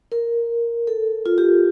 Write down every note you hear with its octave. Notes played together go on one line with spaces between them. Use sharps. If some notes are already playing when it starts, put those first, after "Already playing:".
A#4
A4
F4
G4